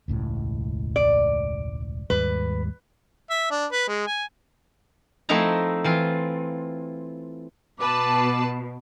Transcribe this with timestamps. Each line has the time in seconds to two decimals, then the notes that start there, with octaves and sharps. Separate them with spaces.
0.08 E1 C#2 A2
0.96 D5
2.10 D#2 G#2 G3 B4
3.30 E5
3.51 D4
3.72 B4
3.88 G#3
4.07 G#5
5.29 F3 A3 C4 D#4 E4 A#5
5.84 E3 C4 F4
7.79 B2 B4 A5 D6